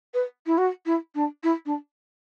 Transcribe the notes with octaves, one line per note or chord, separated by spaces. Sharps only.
B4
E4
F#4
E4
D4
E4
D4